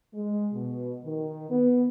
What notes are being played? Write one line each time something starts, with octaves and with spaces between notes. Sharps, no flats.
G#3
B2
D#3
B3